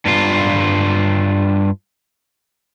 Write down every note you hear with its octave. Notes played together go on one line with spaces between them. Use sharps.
G2 F4